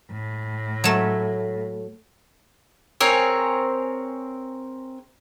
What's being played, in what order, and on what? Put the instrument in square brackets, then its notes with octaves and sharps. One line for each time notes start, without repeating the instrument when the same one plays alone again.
[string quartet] A2
[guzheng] F#3 A3
[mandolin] C4 G#4 A#4 C#5